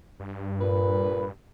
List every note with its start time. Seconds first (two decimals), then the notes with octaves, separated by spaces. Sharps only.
0.20 G2
0.61 A#2 B4